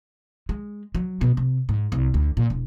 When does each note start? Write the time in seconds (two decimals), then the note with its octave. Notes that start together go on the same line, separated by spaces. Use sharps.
0.49 G#3
0.95 F#3
1.21 B2
1.37 C3
1.69 G#2
1.92 C2
2.14 D2
2.37 A#2
2.50 E1